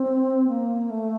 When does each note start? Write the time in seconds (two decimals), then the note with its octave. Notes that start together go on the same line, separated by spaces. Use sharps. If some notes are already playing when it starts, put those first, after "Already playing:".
Already playing: C4
0.47 A#3
0.89 A3